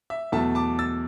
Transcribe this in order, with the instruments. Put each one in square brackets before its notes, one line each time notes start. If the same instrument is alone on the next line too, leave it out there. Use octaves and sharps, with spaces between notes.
[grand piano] E5
E2 B2 F#3 A3 E5 A5
A5 D6
E6 A6